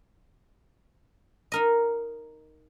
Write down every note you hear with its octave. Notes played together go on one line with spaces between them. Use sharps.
D#4 A#4 D#5